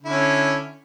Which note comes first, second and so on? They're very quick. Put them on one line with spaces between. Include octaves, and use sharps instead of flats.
D3 E4 C#4